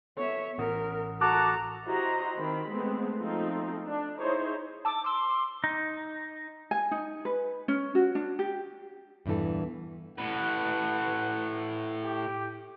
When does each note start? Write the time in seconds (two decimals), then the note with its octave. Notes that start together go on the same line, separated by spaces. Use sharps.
0.17 B3 A4 C#5 E5
0.58 A1 A#4 F#5 D#6
1.21 F#4 A4 A5 A#5 D6 F#6
1.86 E4 F#4 G4 C5 D#5 A#5
2.38 D#3 C4 B5
2.68 G#3 A3 B3 C4
3.20 F3 A3 C4 D#4 F4
3.86 D4
4.19 D#4 E4 G#4 C5 C#5
4.85 A5 D6 E6
5.04 C6 D6 E6
5.64 D#4
6.71 G#5
6.91 D#4
7.25 B4
7.68 C#4
7.95 F#4
8.15 D4
8.39 G4
9.26 E2 G2 A#2 E3 A4
10.18 A2 B4 F#5
12.02 G4